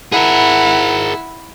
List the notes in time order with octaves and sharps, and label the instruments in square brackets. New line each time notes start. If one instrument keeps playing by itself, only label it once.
[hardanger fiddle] E4 [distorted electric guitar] G#4 A#4 [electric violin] F#5